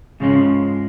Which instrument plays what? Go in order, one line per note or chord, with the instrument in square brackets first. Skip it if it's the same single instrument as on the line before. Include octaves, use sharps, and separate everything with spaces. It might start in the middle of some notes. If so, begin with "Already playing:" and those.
[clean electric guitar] G#2 F3 G#3 [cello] C#3